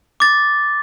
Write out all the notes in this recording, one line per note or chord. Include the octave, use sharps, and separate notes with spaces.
D6 A6